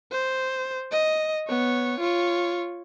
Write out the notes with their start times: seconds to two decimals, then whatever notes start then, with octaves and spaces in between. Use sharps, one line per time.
0.12 C5
0.92 D#5
1.48 B3 C#5
2.00 F4 C#5